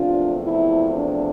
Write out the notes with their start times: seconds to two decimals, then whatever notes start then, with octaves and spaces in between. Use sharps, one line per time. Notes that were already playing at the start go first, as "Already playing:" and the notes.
Already playing: E2 C3 F3 A3 D4 F4
0.42 E4
0.94 D4